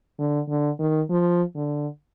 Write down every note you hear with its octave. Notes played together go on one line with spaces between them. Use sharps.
D3
D3
D#3
F3
D3